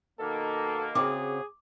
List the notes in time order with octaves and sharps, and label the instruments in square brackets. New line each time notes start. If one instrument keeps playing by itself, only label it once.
[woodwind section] B2 D#3 A#3 [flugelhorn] A4
[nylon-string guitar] C#3 C4 F#4 [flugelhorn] G#4 [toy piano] D6